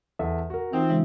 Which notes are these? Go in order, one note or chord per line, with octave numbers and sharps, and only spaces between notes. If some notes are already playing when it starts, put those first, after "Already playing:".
E2 A4 E5
F#4 A#4
E3 C4 D#4 F4
C#3 E3 G#3